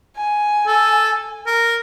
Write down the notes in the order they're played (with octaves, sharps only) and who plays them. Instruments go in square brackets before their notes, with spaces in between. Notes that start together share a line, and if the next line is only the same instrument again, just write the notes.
[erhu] G#5
[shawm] A4
A#4